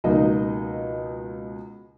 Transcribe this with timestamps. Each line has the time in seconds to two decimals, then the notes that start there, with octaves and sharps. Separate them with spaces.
0.04 C#2 B2 F3 A#3 D#4 D#5